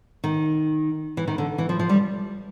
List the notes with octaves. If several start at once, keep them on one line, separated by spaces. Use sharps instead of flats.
D#3
E3
D#3
D3
E3
F3
F3
G3